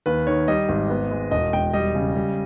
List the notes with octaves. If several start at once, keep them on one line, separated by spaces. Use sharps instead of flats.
D#2 B4
D#3 C#5
G3 D#5
G#1
B3
G#3
E1 D#5
E1 G5
G3 D#5
C#3
G3